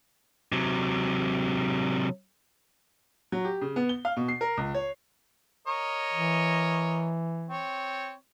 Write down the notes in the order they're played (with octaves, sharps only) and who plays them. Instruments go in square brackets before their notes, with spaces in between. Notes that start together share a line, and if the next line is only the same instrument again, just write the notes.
[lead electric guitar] C3 F#3
[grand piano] F#3
G4
C#3
B3
G7
F5
B2
C7
A#4
C#2
C#5
[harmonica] A#4 C#5 D#5
[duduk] E3
[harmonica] C4 C#5